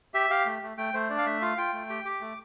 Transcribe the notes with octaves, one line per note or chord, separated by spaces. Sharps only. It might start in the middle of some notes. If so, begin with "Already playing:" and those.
G4 E5
G4 F5
A3
A3
A3 G5
A3 C5
D4 D5
F5
A3 E5
F4 F5
F4 G5
A3
G4
G4 D6
A3